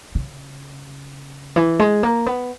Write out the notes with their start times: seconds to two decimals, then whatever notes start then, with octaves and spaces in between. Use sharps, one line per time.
0.15 C#3
1.56 E3
1.79 G#3
2.03 A#3
2.26 B3